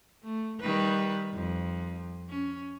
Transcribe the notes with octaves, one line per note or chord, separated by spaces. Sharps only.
A3
D#3 G3 B4
F2
C#4